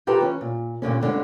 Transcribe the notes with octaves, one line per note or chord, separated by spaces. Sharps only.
D#4 F4 G4 A4 B4 A#5
E3 C#4
A#2
G2 A#2 D3 C#4
G2 D3 G#3 C#4